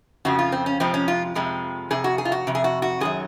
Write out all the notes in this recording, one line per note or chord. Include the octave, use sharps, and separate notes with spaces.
F2 C#3 F3 F#4
F4
C4
C#4
F2 C3 F3 G#3 C4
C#4
F4
F2 C3 F3 G#3
F2 C3 G#4
F#4
G#4
F4
F#4
F2 C3
G#4
F#4
F#4
F#2 D#3 F#3 G#4